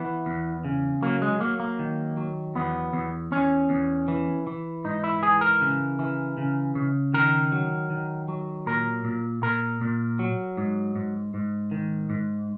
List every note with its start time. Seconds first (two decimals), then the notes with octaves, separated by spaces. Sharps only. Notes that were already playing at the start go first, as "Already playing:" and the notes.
Already playing: E3 B3
0.26 E2
0.64 C#3
1.03 F#3 A#3
1.22 G#3
1.40 F#3 A#3
1.60 A#3
1.79 D#3
2.17 F#3
2.55 E2 B3
2.93 E2
3.32 E2 C#4
3.70 E2
4.08 E3
4.47 E3
4.84 G#2 D#4
5.04 E4
5.22 E3 G#4
5.41 A#4
5.61 C#3
5.99 E3
6.37 C#3
6.75 C#3
7.14 D#3 A#4
7.52 F#3
7.90 D#3
8.28 F#3
8.66 A#2 A#4
9.05 A#2
9.43 A#2 A#4
9.81 A#2
10.19 F#3
10.57 G#2
10.96 G#2
11.34 G#2
11.71 D#3
12.10 G#2